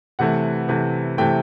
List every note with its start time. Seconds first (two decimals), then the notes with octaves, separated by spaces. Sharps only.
0.19 C3 E3 A3 F#5
0.69 C3 E3 A3
1.18 C3 E3 A3 G5